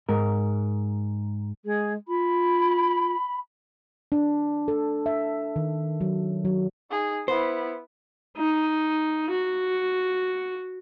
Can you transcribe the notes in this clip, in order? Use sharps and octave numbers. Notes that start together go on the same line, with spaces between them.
G#2 A#4
G#3 G#4
F4 B5
D4
A4
E5
D#3
F#3
F#3
D#4 G#4
B3 E4 C5
D#4
F#4